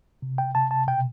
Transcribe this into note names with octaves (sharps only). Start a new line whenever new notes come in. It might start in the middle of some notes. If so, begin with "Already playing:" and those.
C3
G5
C3 A5
A5
B2 G5